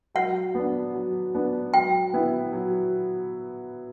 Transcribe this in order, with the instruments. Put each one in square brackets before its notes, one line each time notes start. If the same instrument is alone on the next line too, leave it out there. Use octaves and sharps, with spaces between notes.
[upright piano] F#3 [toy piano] F#5
[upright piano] B3 D4
F#3
B3 D4
[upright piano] F#3 [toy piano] G5
[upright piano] B3 E4
F#3